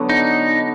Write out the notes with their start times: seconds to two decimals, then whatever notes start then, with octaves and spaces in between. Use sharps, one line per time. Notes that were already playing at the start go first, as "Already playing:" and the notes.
Already playing: D3 F#3 B3
0.09 D#4